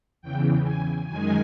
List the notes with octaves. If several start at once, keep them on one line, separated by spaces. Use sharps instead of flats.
E2 C#3 E3 G5
G#5
F#2 D#3 G#3 G#5